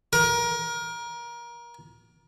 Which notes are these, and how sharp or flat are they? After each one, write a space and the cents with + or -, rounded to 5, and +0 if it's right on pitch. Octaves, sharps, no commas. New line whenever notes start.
A#4 +25